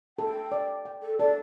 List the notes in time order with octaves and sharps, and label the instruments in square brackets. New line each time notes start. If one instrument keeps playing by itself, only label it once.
[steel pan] A4 [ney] G5
[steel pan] D5
G5
[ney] A4
[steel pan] A4 [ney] D5